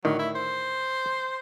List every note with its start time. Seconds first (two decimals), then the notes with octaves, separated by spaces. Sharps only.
0.05 A2 D3 D#3 F#3
0.19 E4
0.36 C5